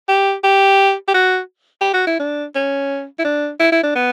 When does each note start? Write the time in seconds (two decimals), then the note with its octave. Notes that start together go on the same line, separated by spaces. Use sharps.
0.08 G4
0.44 G4
1.08 G4
1.14 F#4
1.81 G4
1.93 F#4
2.07 E4
2.20 D4
2.55 C#4
3.19 E4
3.24 D4
3.60 E4
3.72 E4
3.83 D4
3.95 B3